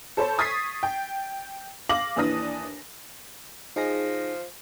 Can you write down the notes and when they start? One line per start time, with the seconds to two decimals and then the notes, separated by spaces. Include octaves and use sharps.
0.17 A4 C5 C#5 A5 B5
0.38 C#6 D#6 G#6 A6 B6 C7
0.83 G5
1.89 F5 D6 A#6 F#7
2.16 D#2 E3 D4 D#6 A#6
3.76 F3 D#4 G#4 A#6